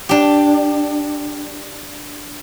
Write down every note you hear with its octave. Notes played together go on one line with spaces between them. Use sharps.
D4 G4